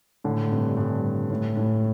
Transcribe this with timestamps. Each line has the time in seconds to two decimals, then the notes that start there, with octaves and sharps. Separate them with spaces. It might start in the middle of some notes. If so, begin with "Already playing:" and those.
0.24 A2 D3
0.51 G2 C3
0.77 G2
1.30 A2
1.57 A2